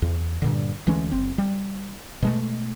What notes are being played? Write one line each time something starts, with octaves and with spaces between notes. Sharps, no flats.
E2
G2 A#2 D3
D2 E3 G#3 C#4
F#1 C4
G3
B2 G#3 A3